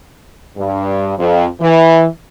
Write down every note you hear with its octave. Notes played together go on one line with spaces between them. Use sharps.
G2
F2
E3